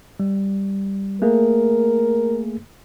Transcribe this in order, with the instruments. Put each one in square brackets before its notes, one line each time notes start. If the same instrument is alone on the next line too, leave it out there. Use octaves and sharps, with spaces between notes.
[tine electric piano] G3
[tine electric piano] A3 A#3 G#4 [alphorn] A#4